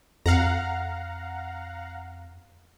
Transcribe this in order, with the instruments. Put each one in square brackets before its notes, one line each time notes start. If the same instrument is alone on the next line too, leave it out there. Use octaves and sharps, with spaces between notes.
[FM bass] F2 [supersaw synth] F5 F#5 A#5